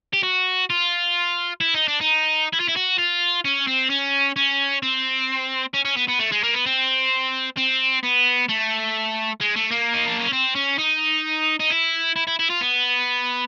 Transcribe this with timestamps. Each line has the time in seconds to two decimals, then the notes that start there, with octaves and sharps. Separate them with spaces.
0.13 G4
0.23 F#4
0.70 F4
1.61 E4
1.74 D#4
1.88 D4
2.01 D#4
2.53 E4
2.60 F4
2.68 E4
2.76 F#4
2.98 F4
3.45 C#4
3.67 C4
3.90 C#4
4.36 C#4
4.82 C4
5.74 C#4
5.85 C#4
5.96 B3
6.08 B3
6.19 A3
6.32 G#3
6.43 A#3
6.54 B3
6.66 C4
7.57 C4
8.03 B3
8.49 A3
9.41 G#3
9.56 A3
9.71 A#3
9.94 D#4
10.07 D4
10.19 C#4
10.33 C4
10.55 C#4
10.79 D#4
11.60 D#4
11.70 E4
12.16 E4
12.27 E4
12.39 E4
12.50 F4
12.61 B3